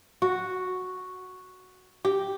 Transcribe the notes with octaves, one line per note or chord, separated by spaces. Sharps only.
F#4
G4